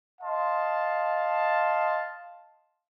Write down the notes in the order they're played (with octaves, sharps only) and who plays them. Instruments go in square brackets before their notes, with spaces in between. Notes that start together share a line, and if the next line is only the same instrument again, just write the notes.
[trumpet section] D#5 F5 A5 C6